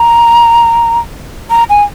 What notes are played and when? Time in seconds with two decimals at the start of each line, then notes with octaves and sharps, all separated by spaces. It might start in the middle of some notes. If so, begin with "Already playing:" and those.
Already playing: A#5
1.50 A#5
1.70 G#5